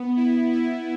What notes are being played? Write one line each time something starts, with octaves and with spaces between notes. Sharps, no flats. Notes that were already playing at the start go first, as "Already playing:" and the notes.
Already playing: B3
E4
E4